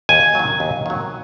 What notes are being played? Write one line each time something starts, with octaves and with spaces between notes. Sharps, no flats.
D#2 G#5
D#3 F#3
D#2
D#3 F#3